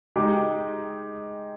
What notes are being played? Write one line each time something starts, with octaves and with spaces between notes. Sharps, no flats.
G#3 D#4 G4